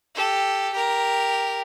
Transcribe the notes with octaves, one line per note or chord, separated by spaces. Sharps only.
G4 A4
G4 A#4